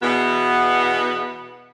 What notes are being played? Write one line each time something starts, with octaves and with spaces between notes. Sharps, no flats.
E2 B2 B3